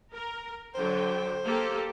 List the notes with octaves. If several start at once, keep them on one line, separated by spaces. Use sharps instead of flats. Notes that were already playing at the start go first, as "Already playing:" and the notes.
A#4
D3 F#3 C5 G5
A#3 G4 A4